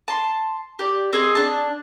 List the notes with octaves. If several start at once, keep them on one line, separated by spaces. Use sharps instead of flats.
A5 C6
G4 D5
C4 G#4 D#5
D4 A5